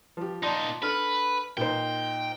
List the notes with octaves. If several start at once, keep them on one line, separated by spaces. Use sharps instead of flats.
F3 G4
A#2 D#4 D5 A5 C6
D4 A4 B4 F6
A#2 D#4 C5 G5